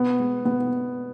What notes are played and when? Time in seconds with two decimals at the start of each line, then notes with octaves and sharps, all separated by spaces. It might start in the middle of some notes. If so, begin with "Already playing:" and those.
Already playing: B2 B3
0.19 G#3
0.45 B2 B3